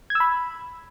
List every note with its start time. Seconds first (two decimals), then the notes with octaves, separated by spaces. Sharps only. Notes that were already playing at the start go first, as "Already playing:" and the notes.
0.10 G#6
0.15 E6
0.20 B5